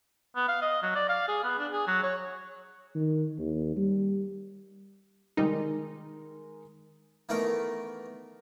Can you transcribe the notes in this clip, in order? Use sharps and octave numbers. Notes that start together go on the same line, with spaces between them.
B3
F5
D#5
F#3
D5
F5
G#4
B3
D4
G#4
F#3
C#5
D#3
D#2
G3
D#3 G3 G#3 D#4 A#4
D#3 E3 A3 B3 A#4